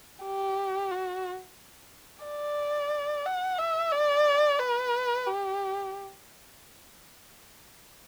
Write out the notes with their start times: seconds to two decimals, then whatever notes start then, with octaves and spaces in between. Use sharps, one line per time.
0.24 G4
0.91 F#4
2.25 D5
3.26 F#5
3.58 E5
3.92 D5
4.59 B4
5.27 G4